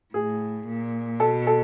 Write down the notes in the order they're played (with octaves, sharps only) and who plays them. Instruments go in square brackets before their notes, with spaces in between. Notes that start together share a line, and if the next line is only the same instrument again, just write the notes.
[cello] A2 [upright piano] G#4
[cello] A#2
[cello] B2 [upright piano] A4
[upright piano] A4